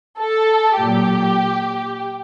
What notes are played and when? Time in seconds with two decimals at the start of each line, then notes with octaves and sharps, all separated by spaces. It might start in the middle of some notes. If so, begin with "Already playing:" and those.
0.19 A4
0.79 A#2 F#3 G4